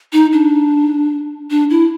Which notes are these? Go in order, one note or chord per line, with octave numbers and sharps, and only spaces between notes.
D#4
D4
D4
E4